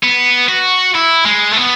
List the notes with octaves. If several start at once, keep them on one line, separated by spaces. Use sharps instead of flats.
B3
F#4
E4
G#3
A3
B3